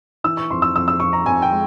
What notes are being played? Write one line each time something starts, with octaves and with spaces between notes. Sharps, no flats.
E3 E6
C#6
F2 C6
E6
F2 E6
E6
F2 C#6
A#5
F2 G#5
G5
G#3